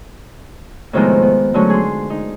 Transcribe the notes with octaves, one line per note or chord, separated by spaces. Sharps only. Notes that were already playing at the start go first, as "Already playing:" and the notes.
A2 C3 D#3 F3 G#3 B3
B3
D3 F#3 G#3 A3 C#4
G#4 C6
D#4